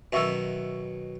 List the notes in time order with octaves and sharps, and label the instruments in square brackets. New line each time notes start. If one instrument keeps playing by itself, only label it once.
[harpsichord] B2 D#3 F#3 [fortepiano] E5 C#6 E6